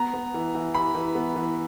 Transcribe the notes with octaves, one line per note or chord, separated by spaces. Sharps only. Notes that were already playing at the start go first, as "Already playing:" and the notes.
Already playing: B3 A#5
B3
E3
E3
E3 B5
E3
B3
E3